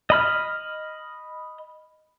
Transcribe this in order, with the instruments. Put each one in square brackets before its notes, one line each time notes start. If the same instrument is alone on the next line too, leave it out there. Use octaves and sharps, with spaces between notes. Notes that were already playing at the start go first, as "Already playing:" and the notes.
[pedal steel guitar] D#5 B5 F6